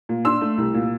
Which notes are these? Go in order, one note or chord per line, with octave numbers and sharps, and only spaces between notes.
A#2
D4 C6 E6
A3
C2
A#2